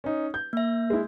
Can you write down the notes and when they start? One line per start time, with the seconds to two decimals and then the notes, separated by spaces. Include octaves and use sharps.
0.04 C#4 D#4
0.34 G6
0.53 A#3 E5
0.90 G#3 E4